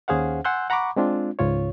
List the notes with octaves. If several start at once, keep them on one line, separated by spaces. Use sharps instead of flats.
D#2 C#4 G#4 C5 F5 F#5
F#5 G#5 C6 E6 F#6 G6
F#5 A#5 B5 C#6 D6
G#3 C4 D4 F4
C#2 G#2 F4 C#5